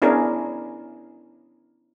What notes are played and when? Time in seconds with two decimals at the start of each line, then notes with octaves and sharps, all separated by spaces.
0.02 B3 C#4 D4 E4 G#4 A#4